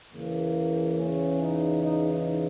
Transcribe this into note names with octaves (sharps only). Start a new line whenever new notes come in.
E2 C#3 E3 A#3
C#4
D#4
D#4
D#4